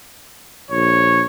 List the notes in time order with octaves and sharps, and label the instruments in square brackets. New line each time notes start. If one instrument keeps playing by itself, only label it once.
[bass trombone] A#1 [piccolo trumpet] C#5